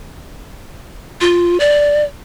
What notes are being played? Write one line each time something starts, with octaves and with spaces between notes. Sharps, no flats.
F4
D5